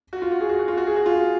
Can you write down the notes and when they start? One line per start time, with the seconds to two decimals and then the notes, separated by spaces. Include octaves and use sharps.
0.13 F#4
0.22 F4
0.32 F#4
0.40 G#4
0.49 F#4
0.60 F#4
0.68 F4
0.77 F#4
0.87 G#4
0.96 F#4
1.06 F4